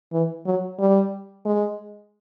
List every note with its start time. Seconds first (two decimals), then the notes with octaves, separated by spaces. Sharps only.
0.12 E3
0.46 F#3
0.79 G3
1.45 G#3